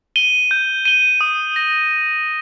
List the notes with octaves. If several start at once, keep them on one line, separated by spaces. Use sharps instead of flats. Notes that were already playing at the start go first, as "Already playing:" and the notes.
D#7 G7
G6
D#7 G7
D#6
A#6